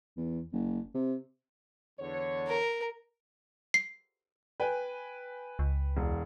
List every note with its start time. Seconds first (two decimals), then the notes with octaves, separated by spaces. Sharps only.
0.17 E2
0.53 F#1
0.94 C3
2.00 E2 D3 C#5
2.47 A#4
3.74 C7
4.60 B4 G5 G#5
5.59 C#2
5.97 E1